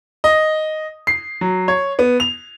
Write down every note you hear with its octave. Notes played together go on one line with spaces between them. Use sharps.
D#5
C7
F#3
C#5
B3
F7